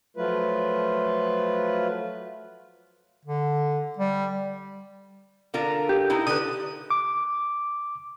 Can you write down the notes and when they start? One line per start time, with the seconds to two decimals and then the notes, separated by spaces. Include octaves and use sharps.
0.17 F3 F#3 A3 F4 B4
3.25 D3
3.98 G3
5.54 D3 F4 A#4
5.89 G4
6.10 D#4 E4
6.27 D3 B4 D#6
6.90 D6